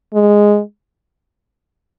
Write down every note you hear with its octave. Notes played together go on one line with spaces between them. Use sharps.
G#3